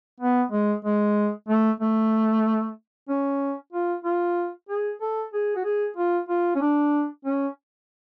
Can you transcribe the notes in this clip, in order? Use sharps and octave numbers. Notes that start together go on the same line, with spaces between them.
B3
G#3
G#3
A3
A3
C#4
F4
F4
G#4
A4
G#4
F#4
G#4
F4
F4
C#4
D4
C#4